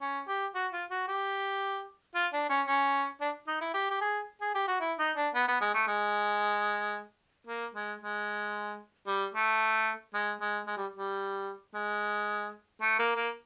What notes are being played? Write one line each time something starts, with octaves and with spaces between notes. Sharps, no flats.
C#4
G4
F#4
F4
F#4
G4
F4
D4
C#4
C#4
D4
D#4
E4
G4
G4
G#4
G#4
G4
F#4
E4
D#4
D4
B3
B3
G#3
A3
G#3
A#3
G#3
G#3
G3
A3
G#3
G#3
G#3
G3
G3
G#3
A3
A#3
A#3